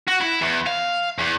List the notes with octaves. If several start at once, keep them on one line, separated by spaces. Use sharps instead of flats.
F#4
E4
E2
F5
E2